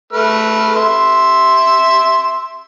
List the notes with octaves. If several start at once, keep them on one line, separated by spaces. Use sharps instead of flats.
A3 B4 F6
E5 C6